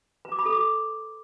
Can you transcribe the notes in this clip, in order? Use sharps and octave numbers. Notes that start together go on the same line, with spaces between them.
B4
D6
B5
A4
D6